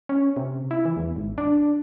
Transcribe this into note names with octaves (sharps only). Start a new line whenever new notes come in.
C#4
C3
E4
E3
E2
G#1
D4